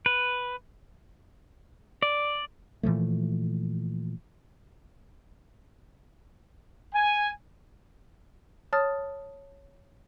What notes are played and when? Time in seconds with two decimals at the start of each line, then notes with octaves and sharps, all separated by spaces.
0.06 B4
2.03 D5
2.83 A#2 E3 F3 A3
6.94 G#5
8.73 C#5 A5 D#6 F6 A6